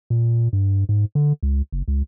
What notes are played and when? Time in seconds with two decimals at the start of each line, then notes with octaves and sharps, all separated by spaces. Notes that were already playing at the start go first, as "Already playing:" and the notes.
0.10 A#2
0.53 G2
0.89 G#2
1.15 D3
1.43 C#2
1.72 F#1
1.88 C#2